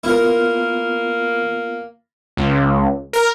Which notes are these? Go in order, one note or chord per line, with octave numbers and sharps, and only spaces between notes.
A#3 B3 E4 F4 A#4
C#2
A#4